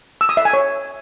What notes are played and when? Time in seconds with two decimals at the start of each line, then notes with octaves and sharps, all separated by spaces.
0.21 E6
0.29 D#6
0.37 E5
0.45 G#5
0.53 C#5